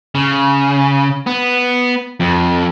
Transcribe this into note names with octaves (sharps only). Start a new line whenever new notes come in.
C#3
B3
F2